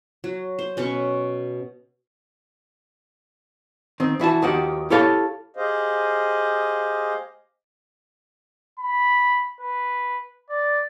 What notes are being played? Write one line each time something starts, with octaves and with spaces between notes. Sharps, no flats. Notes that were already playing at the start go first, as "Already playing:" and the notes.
F#3
C5
B2 C#4 B4 C#6
D#3 C4
E3 E4 F#4 A5
D#2 D#3 F3 F#4 G4 F#5
E4 G4 A4 C#5 F5 A5
G4 G#4 C5 D#5 F5
B5
B4
D5